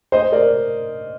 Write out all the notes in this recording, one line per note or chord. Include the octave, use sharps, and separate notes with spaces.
C5 D#5
A#4 D5